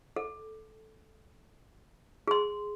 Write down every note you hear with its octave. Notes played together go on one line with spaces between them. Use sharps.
A4
G#4 C6